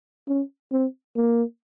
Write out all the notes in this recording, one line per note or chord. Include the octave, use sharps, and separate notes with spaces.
C#4
C4
A#3